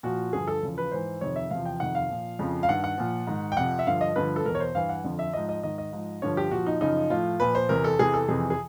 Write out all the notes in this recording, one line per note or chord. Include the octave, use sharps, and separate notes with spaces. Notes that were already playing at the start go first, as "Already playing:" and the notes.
A#2 F3 F#4
G2 D3 F3 G#4
A4
E2 C#3 F3
B4
G#2 E3 C5
F2 C3 D#3 C#5
E5
E2 C3 F3 F5
G5
F2 C3 D#3 F#5
F5
A#2 F3
F2 C#3 F3
F5
G2 D#3 F#5
F#5
A#2 F3
G#2 D#3
G5
F2 C3 F3 F#5
E5
G2 D3 F3 F5
D#5
G2 D3 F3 B4
A4
E2 B2 A#4
C#5
C5
G2 E3 F5
F#5
F2 D3 F3
E5
G#2 F3 D#5
D#5
G#2 D#3 D#5
D#5
G#2 F3
G2 D3 F3 C#5
G4
A#2 F3 F#4
D#4
F#2 C#3 F3 D#4
A2 F3 F4
A#2 F3 B4
C5
E2 C3 E3 A#4
A4
E2 C3 E3 G#4
A4
F2 C3 E3 G#4
G#4